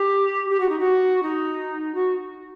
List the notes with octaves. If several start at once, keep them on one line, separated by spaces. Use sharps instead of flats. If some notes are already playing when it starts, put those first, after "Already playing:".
Already playing: G4
G4
F#4
D#4
F#4
D#4
F#4